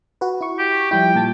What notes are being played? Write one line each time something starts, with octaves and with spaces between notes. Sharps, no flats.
F#4 B4
E4 C#6
G4
F3 G3 E4 G5
A#2 A5 A6